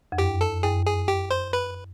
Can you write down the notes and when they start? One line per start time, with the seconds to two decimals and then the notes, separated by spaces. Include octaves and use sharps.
0.12 F2
0.18 F#2 G4
0.41 A4
0.63 F#2 G#4
0.86 G#4
1.08 G4
1.31 C5
1.53 B4